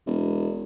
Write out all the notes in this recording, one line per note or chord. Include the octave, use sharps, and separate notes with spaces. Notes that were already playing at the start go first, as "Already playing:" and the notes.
E1